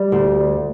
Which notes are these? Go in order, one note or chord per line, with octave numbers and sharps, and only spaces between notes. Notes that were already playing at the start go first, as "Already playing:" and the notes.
Already playing: G3
D2